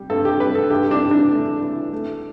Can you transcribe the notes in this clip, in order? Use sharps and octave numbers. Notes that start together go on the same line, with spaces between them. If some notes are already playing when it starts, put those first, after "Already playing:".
Already playing: G3
G2 A4
G4
G3 B4
A4
G2 G4
D4
E3
D4
A3
E3
A3